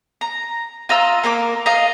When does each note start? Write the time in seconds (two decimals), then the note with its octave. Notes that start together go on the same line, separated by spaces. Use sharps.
0.21 A#5
0.89 F4 D#5 A#5 E6
1.23 A#3 A#4 G5 D6
1.66 F4 D#5 F5 A#5